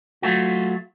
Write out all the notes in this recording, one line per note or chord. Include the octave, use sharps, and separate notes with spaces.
F#3 A3 F4 F#4